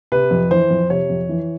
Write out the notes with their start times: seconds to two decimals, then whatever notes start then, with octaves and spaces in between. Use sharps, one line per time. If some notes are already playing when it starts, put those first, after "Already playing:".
0.12 C3 B4
0.31 F2
0.51 E3 C5
0.71 F2
0.90 C3 C#5
1.10 F2
1.29 E3